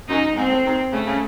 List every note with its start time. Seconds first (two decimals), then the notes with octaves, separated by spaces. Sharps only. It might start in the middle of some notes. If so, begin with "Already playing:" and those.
0.08 F#2 D#4
0.36 G#2 C4
0.51 A2
0.64 C3 D#3
0.93 C#3 A3
1.06 C#3